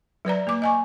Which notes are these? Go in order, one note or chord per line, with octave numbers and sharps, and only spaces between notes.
F#3 B4 D5 A#5
A#3 D6
D#5 G#5 C#6